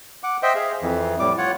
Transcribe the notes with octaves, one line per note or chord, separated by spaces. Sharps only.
F#5 D6
C5 D#5 E5 G5
G#4 F5
F2 E3
A2 G3 D6
F4 C#5 F#5